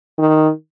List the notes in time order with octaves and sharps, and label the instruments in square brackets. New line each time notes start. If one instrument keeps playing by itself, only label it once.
[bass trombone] D#3